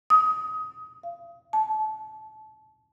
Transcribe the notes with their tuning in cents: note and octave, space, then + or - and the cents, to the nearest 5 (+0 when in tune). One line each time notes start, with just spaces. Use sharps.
D#6 +25
F5 -35
A5 -25